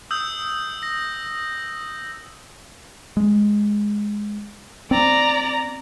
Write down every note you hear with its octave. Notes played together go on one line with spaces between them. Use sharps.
D#6 E6 G6
A#6
G#3
C4 D5 A#5